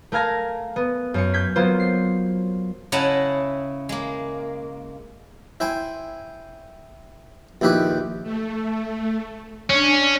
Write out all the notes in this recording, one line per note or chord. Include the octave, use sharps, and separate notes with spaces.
A3 A#4 F5 G#5 A#5
B3
F#2 C#7
G6 G#6 B6
F#3 A#3 B3 F4 C5
C7
C#3 E4 D#5 F#5 A5 A#5
G#3 A#3
E4 C5 G5 G#5
A#1 D#2 E4 G4 B4 D6
A3
C#4 D4